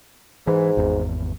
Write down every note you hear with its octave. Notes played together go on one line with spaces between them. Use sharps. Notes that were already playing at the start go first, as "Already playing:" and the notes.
G#2 E3
G#1 E2